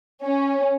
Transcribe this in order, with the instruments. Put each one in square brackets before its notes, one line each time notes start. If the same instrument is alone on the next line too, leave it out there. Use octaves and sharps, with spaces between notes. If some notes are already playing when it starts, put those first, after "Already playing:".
[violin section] C#4